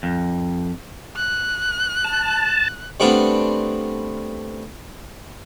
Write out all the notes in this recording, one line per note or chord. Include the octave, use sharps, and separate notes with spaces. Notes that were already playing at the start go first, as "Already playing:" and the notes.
F2
F#6
A5
G3 A3 B3 C4 D4 F4